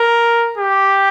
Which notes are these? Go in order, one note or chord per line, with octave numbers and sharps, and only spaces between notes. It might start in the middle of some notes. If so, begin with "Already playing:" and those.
Already playing: A#4
G4